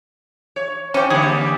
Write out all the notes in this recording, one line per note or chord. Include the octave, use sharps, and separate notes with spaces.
C#5
C4 C#4 G4
D3 G3 A#3 G#4